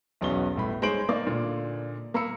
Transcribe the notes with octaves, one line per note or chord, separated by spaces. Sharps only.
B1 E2 B3 C#4 F#4 G7
G1 A2 B5
G#3 D#4 C5 C#5 D7 F#7
A#3 D#4 D5 D6
A#2 D3
A#3 A#5 B5 E6 C#7